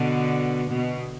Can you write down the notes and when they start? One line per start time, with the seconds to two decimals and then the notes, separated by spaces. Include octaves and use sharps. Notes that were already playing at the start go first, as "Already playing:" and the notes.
Already playing: B2 D3
0.71 B2